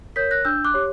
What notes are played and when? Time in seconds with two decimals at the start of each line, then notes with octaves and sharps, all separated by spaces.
0.16 A#4 C#5 G6 B6
0.31 F#6 A#6
0.45 D4 E6 G6
0.65 D6 F#6
0.74 G4 C#5